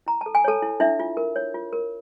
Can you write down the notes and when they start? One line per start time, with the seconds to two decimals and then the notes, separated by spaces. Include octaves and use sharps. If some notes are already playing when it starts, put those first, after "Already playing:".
0.06 E4 A#5
0.21 A4 A5
0.35 G#5
0.44 A4 C#5 A5
0.62 E4
0.80 D4 E4 E5
1.00 F4
1.17 A#4
1.36 C#5
1.54 F4
1.73 A#4